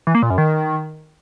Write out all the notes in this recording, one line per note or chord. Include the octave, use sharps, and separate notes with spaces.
E3
A#3
A#2
F#2
D#3